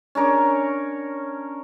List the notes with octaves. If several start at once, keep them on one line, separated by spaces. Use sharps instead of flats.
C#4 D4 A#4 C#5